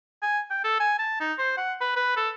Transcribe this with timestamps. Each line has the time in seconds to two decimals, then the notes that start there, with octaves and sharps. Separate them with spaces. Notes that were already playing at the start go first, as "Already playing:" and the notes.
0.22 G#5
0.50 G5
0.64 A4
0.80 G#5
0.99 A5
1.20 D#4
1.39 C5
1.57 F#5
1.81 B4
1.96 B4
2.17 A4